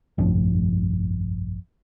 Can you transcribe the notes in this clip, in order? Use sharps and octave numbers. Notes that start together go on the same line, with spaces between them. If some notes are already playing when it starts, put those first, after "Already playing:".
F1 A#1 G2 F3